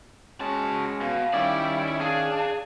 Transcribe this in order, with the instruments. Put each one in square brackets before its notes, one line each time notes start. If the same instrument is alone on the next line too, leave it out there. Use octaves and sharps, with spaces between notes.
[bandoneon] G#3 C#4 [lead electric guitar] F#4 A5
[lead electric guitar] B2 [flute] F5
[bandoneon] D#3 C#4 [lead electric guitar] E4 [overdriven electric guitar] G4 D5
[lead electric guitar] D4 [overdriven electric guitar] G#4 [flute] F5